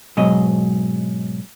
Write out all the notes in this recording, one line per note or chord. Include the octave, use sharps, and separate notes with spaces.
G#2 B2 F#3 D#5